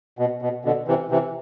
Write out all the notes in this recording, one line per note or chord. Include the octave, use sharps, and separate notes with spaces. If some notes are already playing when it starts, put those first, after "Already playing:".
B2
B2
B2 D3
C3 E3
C3 E3